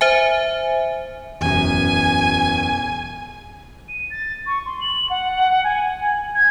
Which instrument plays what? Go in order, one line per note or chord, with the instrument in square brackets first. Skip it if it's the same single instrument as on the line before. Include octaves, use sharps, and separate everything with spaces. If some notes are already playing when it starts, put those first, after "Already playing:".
[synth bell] C5 E5 G#5
[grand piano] E1 A1 F#2 [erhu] G#5
[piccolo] D#7
A6
C#6
C6
F#7
F#5
G#5
G#6